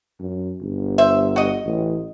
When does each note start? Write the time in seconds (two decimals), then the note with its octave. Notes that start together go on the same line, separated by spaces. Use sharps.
0.20 F#2
0.61 G1
0.98 C5 E5
1.36 F#4 D#5
1.65 A1